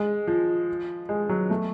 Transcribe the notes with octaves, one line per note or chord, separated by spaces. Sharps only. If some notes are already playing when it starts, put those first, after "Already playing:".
Already playing: G#3
F3
G#3
F#3
A3